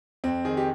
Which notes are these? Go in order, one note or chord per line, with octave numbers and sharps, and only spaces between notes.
F2 C4
D#3 G#4
G4